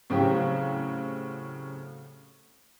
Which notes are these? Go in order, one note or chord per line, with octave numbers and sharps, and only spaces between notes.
A2 C#3 F#3 C4 F#4 G4